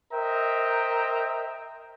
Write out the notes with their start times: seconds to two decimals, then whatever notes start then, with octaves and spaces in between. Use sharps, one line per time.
0.13 A#4 C5 D#5 E5 G5 A#5